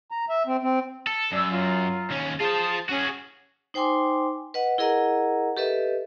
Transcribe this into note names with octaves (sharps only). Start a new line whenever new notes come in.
A#5
E5
C4
C4
A4
F#2 D5 E6
F#3 F4
D#2 C#4
F4 G#4 C5 A5
C#4 F#4 G#4
D#4 C5 G5 G#5 C6 D6
B4 D#5 F#5
E4 G#4 A#4 D#5 F#5 A#5
G4 A4 B4 D#5 E5